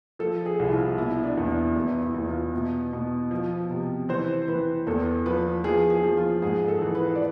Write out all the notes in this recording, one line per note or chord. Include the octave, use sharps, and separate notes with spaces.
F3 A4
G#4
C2
E4
F4
B2 E4
D4
E2
E2 E4
E4
E2
F4
B2
B2
F3
C3
E3 C5
E3 B4
E2 A4
F3 B4
F3 G#4
G#4
F3
F4
G#2 G#4
A4
E3
B4
D5